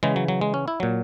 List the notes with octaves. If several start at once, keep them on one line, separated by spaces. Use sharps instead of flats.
C#3 E3 G#3
F#3
F#3
G#3
C#4
E4
A#2 F#3